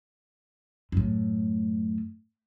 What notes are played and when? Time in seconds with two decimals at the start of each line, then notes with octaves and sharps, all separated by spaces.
0.92 F#2 A2